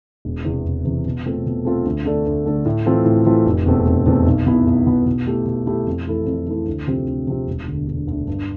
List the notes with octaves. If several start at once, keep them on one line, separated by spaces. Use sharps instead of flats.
E1
E2 C3 E3
E1
E2 C3 E3
B2
A3 C4 F4 A4
B2
A3 C4 F4 A4
D2
D3 A3 D4 A4
D2
D3 A3 D4 A4
A2
E3 A3 C4 F4
A2
E3 A3 C4 F4
F1
E2 B2 A3 C4
F1
E2 B2 A3 C4
B1
B2 B3 E4
B1
B2 B3 E4
B2
A3 E4 G4
B2
A3 E4 G4
F2
E3 A3 E4 A4
F2
E3 A3 E4 A4
D2
C3 F3 C4 G4
D2
C3 F3 C4 G4
E1
D2 D3
E1
D2 D3
G2